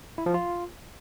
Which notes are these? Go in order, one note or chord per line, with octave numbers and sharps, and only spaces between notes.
E4
F3
F4